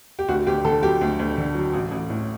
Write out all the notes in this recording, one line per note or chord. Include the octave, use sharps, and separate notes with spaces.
G4
D2 F#4
D2 G4
D3 A4
F#3 G4
D2
D2
D3
F#3
A1
A1
A2